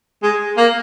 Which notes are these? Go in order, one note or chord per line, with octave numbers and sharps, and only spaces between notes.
G#3
A#3